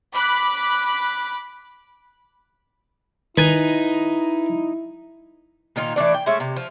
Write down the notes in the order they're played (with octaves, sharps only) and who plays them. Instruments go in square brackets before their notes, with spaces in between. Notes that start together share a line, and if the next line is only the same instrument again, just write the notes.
[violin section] B5 D6 F#6
[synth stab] D#3 [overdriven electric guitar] D#4 [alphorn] E4 [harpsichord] B4 G#5
[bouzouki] A#2 D#3 D#4 F4
E3 A3 D4 D5
G5
G#3 A3 C#4 E5
C3
F3